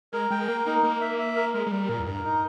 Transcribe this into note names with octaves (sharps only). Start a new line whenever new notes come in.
G#3 A#4
G#3 G5
A#3 A#4
A#3 D#4
A#3 A#4
E5
E5
A#4
G#3 A#4
G#3
G3 A#4
A#2 A#4
E2
G2 A#4
D#4